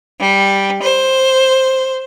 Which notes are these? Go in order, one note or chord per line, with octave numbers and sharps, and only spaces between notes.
G3
C5